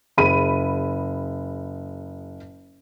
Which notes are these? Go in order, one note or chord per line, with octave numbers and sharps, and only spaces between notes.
F#1 G#4 B5 D#7